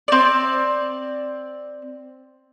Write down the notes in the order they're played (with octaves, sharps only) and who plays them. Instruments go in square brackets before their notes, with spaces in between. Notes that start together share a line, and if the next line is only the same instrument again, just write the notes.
[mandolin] C4 D5